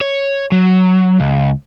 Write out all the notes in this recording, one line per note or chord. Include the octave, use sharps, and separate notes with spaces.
C#5
F#3
C#2